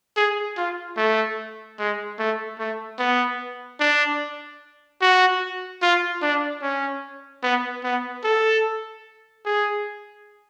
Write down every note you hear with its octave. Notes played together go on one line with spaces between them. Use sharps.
G#4
F4
A3
G#3
A3
A3
B3
D4
F#4
F4
D4
C#4
B3
B3
A4
G#4